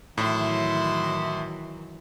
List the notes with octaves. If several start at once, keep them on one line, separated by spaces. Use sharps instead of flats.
A2 D#3 E3 F#3 E4 C6